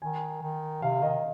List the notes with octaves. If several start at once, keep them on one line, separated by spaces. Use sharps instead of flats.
D#3 G#5
D#3
C3 F5
D#3 D#5